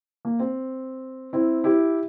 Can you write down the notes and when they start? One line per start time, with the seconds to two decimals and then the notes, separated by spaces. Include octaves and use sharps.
0.25 A#3
0.40 C4
1.33 C4 E4
1.64 E4 G4